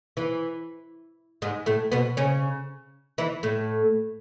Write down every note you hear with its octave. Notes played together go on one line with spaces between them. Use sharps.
E3
G#2 G#3
A2 A3
B2 B3
C#3 C#4
E3 E4
A2 A3